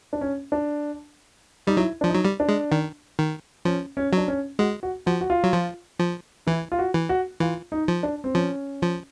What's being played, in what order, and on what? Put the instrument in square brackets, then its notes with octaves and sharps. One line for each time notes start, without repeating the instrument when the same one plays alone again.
[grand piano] D4
C#4
D4
[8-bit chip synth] G3 [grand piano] D#4
[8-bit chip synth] F#3 [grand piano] E4
[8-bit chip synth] F3 [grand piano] D4
[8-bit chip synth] F#3 [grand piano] D#4
[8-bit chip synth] G3
[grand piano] D4
[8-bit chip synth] G#3
D#3
D#3
[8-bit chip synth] F3 [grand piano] C#4
[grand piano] C#4
[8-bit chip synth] F#3 [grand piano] D4
[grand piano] C#4
[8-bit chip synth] G#3 [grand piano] F#4
[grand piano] F#4
[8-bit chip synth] F3 [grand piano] F#4
[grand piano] F#4
F4
[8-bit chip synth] F#3
F3
F3
[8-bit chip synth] E3 [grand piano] E4
[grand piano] F4
F#4
[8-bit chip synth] E3
[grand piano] F#4
[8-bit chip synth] E3 [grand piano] F4
[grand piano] D#4
[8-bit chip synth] F3
[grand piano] D4
C4
[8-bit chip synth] F3 [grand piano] C#4
[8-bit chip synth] F3